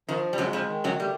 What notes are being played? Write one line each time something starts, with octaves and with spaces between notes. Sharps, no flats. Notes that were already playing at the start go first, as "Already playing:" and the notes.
D#3 F3
G3
F#2 F#3 G#3
F2 F3
D#3
F#2 F#3
G3 A3